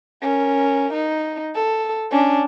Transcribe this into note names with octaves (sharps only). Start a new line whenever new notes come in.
C#4 A#4
D#4
A4
C#4 D4